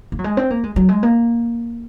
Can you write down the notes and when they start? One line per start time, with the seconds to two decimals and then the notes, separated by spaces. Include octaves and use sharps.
0.12 A#3
0.19 F#3
0.24 G#3
0.37 C4
0.50 A#3
0.64 G#3
0.76 F#3
0.89 G#3
1.03 A#3